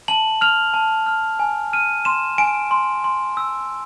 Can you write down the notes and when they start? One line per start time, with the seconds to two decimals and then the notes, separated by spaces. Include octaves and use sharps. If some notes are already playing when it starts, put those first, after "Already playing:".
0.08 A5 F#7
0.41 F6 F7
0.74 A5
1.07 F6
1.39 G#5
1.73 F6 D#7
2.05 C6 E7
2.38 G#5 D7
2.71 C6
3.04 C6
3.37 E6